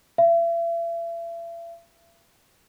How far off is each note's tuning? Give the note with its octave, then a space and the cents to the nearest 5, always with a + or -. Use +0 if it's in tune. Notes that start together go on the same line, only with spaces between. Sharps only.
E5 +40